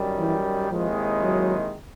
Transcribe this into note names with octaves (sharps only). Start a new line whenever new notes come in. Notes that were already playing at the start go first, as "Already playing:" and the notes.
Already playing: F#2 D#3 G3
E3
D#2 D#3 F3 G#3 C4 E4
F#3